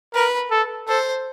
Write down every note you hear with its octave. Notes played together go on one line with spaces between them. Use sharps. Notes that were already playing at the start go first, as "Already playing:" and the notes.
A#4 B4
A4
A4 C5